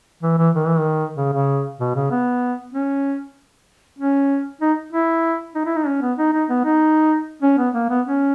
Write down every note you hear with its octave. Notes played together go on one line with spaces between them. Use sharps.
E3
E3
D#3
E3
D#3
C#3
C#3
B2
C#3
B3
C#4
C#4
D#4
E4
D#4
E4
D#4
C#4
B3
D#4
D#4
B3
D#4
C#4
B3
A#3
B3
C#4